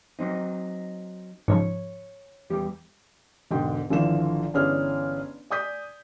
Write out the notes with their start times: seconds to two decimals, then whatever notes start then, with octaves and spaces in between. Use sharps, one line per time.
0.19 F#3 C4 D#4
1.48 G#2 C#3 F3 C#5
2.50 E2 G3 G4
3.51 E1 G#2 D3 G5
3.90 G#1 D3 E3 F3 E7
4.54 G1 E3 C#4 G#4 D5 F6
5.50 D5 G#5 D#6 G6 B6